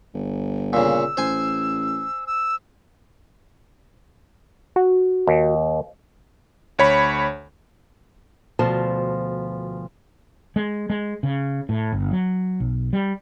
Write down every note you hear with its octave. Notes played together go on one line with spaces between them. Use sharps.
G1
A#2 C#3 E6
A1 C5 G#5
E6
F#4
D#2
D2 C#5 B5
D2 B2 F3 C5 A5
G#3
G#3
C#3
A2
G1
F#3
B1
G3